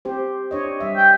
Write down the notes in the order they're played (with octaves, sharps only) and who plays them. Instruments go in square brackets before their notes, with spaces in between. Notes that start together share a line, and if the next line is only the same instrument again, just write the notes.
[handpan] C4 G4 C5
D4 C#5 D#5
G3 E5
[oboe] G5